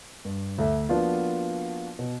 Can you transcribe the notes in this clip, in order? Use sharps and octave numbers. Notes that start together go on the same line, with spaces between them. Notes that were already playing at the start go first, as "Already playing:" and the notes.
G2
D2 A4 E5
F3 A#3 B3 D4 F4 F#4
B2